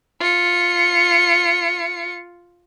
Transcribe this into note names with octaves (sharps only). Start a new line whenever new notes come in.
F4 C#7